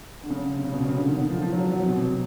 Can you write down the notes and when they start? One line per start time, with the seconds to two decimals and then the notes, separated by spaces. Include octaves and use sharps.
0.23 D3
0.30 C#3
0.53 C3
0.64 C#3
0.73 B2
0.80 C3
0.89 C#3
0.96 D3
1.08 D#3
1.19 D3
1.30 F3
1.42 F3
1.53 F#3
1.72 F#3
1.80 C3
1.88 B2
1.97 C3